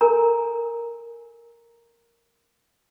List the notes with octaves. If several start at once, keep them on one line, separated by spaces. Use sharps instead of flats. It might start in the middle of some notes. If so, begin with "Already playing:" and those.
A4 A#4 G#5 A#5